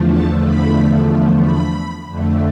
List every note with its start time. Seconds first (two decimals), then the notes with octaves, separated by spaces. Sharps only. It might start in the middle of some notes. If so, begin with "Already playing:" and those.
Already playing: E2 D3 F3 A3
0.11 A5
0.44 B5
1.43 B5
2.08 F2 D3 A3